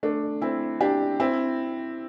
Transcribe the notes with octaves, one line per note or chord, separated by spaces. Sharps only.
A3 D4
C4 E4
D4 G4
C4 E4